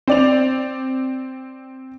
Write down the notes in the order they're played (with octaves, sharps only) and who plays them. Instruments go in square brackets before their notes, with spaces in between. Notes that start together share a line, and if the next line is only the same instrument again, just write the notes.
[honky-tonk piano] C4 D5 F7